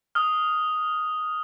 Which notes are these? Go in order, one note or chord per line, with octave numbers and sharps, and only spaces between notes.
D#6 F6